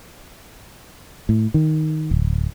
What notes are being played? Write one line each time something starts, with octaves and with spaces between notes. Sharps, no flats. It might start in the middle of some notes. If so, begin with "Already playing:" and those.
A2
D#3
D1